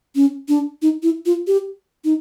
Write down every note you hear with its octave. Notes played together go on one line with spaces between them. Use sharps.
C#4
D4
D#4
E4
F4
G4
D#4